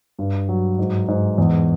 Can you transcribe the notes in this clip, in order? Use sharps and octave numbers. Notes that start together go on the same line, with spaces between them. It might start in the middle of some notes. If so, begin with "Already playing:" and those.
G2
F#3
G#2
G#2
E2